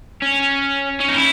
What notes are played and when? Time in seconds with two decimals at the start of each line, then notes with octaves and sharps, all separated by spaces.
0.22 C#4
1.00 C#4
1.09 D#4
1.16 E4